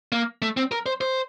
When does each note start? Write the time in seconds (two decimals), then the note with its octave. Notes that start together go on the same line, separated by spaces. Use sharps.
0.12 A#3
0.42 A3
0.57 C4
0.72 A#4
0.86 C5
1.01 C5